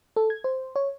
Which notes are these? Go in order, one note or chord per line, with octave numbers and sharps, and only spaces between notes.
A4
G#6
C5
C#5